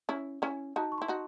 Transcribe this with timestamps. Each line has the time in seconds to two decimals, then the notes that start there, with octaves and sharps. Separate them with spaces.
0.09 C#4 E4
0.42 C#4 E4
0.76 D#4 F#4 A5
0.92 C#6
0.98 E4 C6
1.08 D#4 F#4